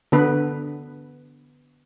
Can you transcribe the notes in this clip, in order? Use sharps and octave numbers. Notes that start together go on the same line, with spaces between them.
D3 B3 B4